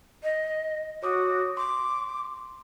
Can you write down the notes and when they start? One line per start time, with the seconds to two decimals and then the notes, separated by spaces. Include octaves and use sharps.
0.23 D#5
1.03 F#4 C#5 D6 D#6
1.57 C6 D6